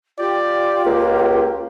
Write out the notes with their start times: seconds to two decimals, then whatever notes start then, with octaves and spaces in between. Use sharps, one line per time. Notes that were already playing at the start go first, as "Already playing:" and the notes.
0.18 F4 G4 D5
0.85 C#2 A#3